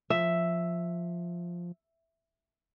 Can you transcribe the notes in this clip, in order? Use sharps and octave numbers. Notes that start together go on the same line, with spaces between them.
F3 E5